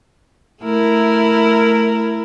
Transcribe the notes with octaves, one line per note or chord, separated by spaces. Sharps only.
A3 E4 A#4